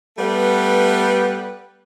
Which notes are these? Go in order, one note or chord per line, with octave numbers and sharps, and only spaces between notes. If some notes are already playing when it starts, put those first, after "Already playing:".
G3 A3 B3 B4